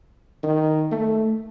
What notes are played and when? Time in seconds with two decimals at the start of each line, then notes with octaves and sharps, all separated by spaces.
0.43 D#3
0.91 A3